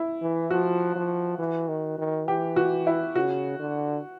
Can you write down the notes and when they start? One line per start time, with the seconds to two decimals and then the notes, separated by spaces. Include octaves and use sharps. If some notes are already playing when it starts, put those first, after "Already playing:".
Already playing: E4
0.22 E3
0.51 F3 F#4
0.95 F3
1.39 E3
1.68 D#3
1.98 D#3
2.27 E3 G4
2.56 F#4
2.87 E4
3.15 C#3 F#4
3.59 D3